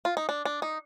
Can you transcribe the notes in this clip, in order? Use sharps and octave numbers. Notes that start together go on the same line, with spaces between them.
F4
D#4
D4
D4
D#4